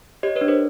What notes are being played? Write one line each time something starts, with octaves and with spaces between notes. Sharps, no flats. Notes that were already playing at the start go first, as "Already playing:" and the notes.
G4 C#5 D#5
B4 C#5
D4
A#4 C5